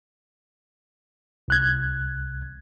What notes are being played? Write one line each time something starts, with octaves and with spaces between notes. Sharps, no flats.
C2 F#6 G#6